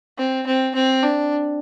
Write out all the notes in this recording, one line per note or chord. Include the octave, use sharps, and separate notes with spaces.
C4
C4
C4
D4